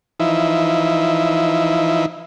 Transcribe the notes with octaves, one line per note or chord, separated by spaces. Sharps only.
E3 F3 D#4 E4